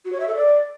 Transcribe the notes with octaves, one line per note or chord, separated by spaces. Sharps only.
F#4
C#5
E5
A4
D5